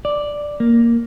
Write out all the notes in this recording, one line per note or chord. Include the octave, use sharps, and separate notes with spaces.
D5
A#3